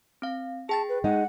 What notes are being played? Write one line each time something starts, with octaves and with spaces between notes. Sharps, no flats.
C4 F5
G#4 G5 A5 A6
B4
G#3 D#4 F#5